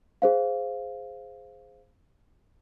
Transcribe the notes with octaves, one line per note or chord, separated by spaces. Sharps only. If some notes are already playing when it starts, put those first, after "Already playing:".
G#4 C5 F5